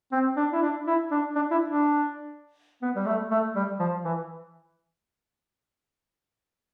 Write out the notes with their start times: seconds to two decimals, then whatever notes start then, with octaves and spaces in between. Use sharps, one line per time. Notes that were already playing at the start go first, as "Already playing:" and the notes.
0.12 C4
0.37 D4
0.52 E4
0.62 D4
0.87 E4
1.11 D4
1.35 D4
1.51 E4
1.68 D4
2.82 B3
2.95 G3
3.06 A3
3.31 A3
3.56 G3
3.79 F3
4.04 E3